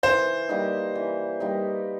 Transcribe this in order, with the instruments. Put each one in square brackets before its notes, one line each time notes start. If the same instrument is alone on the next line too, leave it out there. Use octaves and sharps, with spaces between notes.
[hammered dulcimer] E3 [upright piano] C5
[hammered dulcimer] G3 A#3 D#4
E3
G3 A#3 D#4